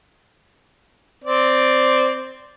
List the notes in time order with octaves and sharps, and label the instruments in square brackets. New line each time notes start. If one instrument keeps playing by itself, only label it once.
[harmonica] C4 D5